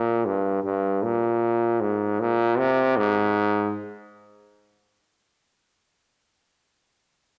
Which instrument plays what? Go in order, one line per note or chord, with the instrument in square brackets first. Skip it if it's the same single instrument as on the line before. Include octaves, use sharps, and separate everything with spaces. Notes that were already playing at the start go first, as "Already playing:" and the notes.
Already playing: [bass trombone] A#2
G2
G2
A#2
G#2
A#2
C3
G#2